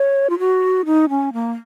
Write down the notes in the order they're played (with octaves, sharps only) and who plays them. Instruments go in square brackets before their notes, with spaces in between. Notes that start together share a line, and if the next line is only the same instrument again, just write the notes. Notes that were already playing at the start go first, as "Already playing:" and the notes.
Already playing: [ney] C#5
F4
F#4
D#4
C#4
A#3